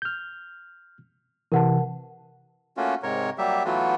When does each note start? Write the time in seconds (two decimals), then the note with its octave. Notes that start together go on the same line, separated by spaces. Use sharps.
0.02 F6 G6
1.52 C3 E3 A#4 F#5 A5
2.77 A3 A#3 C#4 F4 F#4
3.03 G#2 C3 A#4 C#5
3.38 F#3 G3 A#3 G4 E5
3.65 E3 F#3 A3 B3 F4 F#4